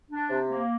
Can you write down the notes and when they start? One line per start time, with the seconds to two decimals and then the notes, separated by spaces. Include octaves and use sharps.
0.11 D4
0.30 C3
0.50 A#3